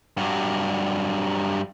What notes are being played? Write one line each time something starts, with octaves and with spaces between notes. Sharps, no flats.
G2 F#3